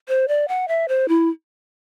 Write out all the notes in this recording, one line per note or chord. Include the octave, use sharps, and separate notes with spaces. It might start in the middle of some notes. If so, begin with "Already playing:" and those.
C5
D5
F#5
E5
C5
E4